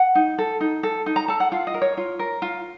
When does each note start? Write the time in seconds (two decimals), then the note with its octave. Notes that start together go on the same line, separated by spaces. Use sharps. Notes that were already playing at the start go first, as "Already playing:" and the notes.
Already playing: F#5
0.15 D#4
0.38 A4
0.60 D#4
0.83 A4
1.06 D#4
1.16 A#5
1.28 A4 A5
1.40 F#5
1.52 F4 F5
1.67 D#5
1.74 A#4
1.82 C#5
1.97 F4
2.19 A#4
2.42 F4